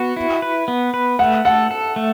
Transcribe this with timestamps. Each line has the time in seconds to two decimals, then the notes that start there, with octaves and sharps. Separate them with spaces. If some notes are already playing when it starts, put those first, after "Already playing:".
Already playing: B3 F#4
0.17 E4
0.42 B4
0.68 B3
0.94 B4
1.19 A3 F#5
1.45 A4 F#5
1.71 A4
1.96 A3